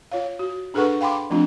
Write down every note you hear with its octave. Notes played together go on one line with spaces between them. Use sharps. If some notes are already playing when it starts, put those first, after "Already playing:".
F4 C#5 F5
F#4
D4 G#4 A4 B4 F#5 C#6
F5 G5 B5 C6 D6
F3 A3 C4 D4 F4